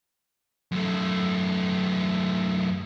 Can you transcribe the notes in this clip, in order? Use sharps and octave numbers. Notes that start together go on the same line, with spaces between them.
F#2 A3